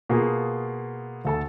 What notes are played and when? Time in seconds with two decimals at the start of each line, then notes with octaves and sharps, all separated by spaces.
0.09 B2 A#3 F4 G#4
1.25 D2 A4 A5